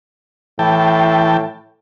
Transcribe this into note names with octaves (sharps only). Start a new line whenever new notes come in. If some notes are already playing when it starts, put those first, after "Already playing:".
A2 E3 G5 A5